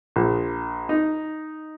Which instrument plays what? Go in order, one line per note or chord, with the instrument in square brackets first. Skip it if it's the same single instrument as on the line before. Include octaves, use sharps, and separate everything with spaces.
[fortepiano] A#1
D#4